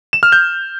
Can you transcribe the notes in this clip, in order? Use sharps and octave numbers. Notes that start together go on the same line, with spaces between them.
E7
F6
G6